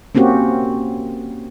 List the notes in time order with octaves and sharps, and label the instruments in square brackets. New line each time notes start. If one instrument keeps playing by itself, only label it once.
[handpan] A#3 C4 C#4 F#4 G4